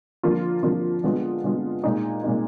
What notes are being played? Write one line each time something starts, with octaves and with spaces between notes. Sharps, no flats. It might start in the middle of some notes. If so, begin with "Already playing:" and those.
D3 F3 A#3 F4
D3 F3 A#3 F4
D3 G#3 B3 F4
D3 G#3 B3 F4
A#2 G#3 D#4
A#2 G#3 D#4